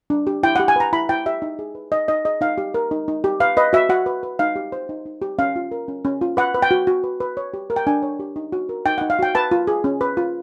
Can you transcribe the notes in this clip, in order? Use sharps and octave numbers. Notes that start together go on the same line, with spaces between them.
D4
G4
E4 G5
G4 F#5
G#5
B4 A#5
E4 B5
E4 G5
G4 E5
D#4
G#4
B4
D#4 D#5
D#4 D#5
G#4 D#5
D#4 F5
G4
A#4
D#4
D#4
G4
B4 F5
B4 D#5
F#4 E5
F#4 F#5
B4
B4
D#4 F5
G4
C5
D#4
D#4
G4
C#4 F5
F4
A#4
C#4
C#4
F4
B4 F#5
B4
G5
F#4
F#4
B4
B4
C#5
G4
A#4
G5
D4 G#5
C#5
G4
D#4
F#4
A#4
D#4 G5
D#4 F#5
F5
F#4 G5
B4 A5
F4
G#4
C#4
B4
F4